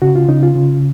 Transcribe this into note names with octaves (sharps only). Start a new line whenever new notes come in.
C#3 F#4
F4
C#3 D#4
F4
C#3